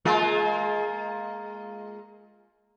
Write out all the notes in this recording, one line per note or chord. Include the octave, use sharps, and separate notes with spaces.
G#3 A#3 F4